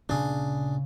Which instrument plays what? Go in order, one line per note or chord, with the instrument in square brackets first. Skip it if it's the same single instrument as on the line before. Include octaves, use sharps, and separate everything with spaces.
[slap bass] D2 A#2 C#4 [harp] C#3 [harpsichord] D4 G#4